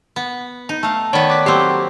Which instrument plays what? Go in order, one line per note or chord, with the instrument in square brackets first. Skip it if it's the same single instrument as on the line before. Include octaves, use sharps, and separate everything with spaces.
[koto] B3
D#4
A3 F5
[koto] D#3 B3 [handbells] C#5 D5 B5
[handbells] D6 F#6 B6
[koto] F#3 A#3 C4 [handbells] G4 A4